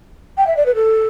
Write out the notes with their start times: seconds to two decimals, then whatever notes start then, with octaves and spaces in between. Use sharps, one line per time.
0.38 G5
0.47 E5
0.57 D5
0.66 B4
0.75 A4